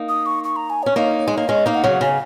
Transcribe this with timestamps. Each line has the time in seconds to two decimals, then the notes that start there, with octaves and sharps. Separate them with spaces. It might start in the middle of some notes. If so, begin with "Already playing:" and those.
Already playing: A#3 D#4
0.09 D#6
0.26 C#6
0.44 C#6
0.56 A#5
0.70 G#5
0.83 C#4 C#5
0.96 A#3 D#4
1.28 G#3
1.37 A#3
1.48 G#3 C#4 D#5
1.66 A#3 D#4
1.75 F#5
1.84 C#3 F#3
2.01 C#3 G#5